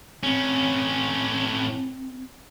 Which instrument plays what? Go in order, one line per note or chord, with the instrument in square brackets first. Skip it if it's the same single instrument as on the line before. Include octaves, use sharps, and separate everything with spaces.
[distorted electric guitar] A2 C#4 [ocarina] C4